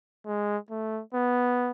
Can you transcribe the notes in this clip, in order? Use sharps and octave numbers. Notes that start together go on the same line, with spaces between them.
G#3
A3
B3